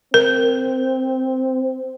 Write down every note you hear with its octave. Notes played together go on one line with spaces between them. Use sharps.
C4 A#4